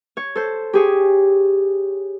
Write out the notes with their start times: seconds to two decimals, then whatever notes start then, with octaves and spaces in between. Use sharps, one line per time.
0.17 C#5
0.36 A4 C5
0.73 G4 G#4 C#5